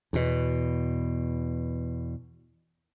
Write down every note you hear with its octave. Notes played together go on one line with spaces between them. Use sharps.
E2 B2